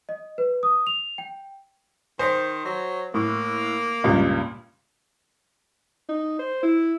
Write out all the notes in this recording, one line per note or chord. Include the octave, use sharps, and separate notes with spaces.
D#5
B4
D#6
F7
G5
D#3 C5
F#3
A2 A#3
C#2 G2 A#2
D#4
C5
E4